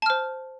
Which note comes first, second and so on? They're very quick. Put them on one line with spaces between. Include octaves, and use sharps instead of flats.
A5 F6 C5